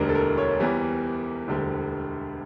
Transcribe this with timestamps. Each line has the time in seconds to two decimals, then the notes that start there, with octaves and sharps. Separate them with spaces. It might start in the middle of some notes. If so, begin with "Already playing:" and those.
Already playing: E1 D2 D3 G3 D4 A#4
0.09 A4
0.15 A#4
0.38 C#5
0.60 E2 E3 G3 A#4
1.48 E1 D2 D3 G3